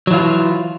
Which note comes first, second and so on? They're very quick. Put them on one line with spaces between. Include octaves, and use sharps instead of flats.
F#3 E3 F4